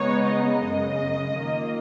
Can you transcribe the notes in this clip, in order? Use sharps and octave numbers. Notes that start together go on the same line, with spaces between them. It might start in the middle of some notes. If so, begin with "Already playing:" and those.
Already playing: C#3 G#3 B3 D#4 C#5
D#5
F#2 C#3 G#3
D#3 A#3 F4